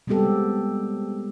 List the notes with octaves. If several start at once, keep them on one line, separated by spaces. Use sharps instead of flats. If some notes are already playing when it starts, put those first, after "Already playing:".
G3 G#3 B3 C4 G4 A4